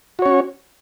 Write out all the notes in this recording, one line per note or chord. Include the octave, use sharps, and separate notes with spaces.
C#4 F#4 C#5